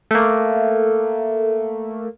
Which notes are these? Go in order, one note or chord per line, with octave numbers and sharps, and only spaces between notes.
A3 A#3